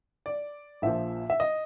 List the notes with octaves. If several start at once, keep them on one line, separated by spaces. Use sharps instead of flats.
D5
A#1 A#2 F3 E5
E5
D#5